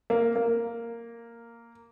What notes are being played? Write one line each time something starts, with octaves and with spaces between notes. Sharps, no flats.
A#3
A#3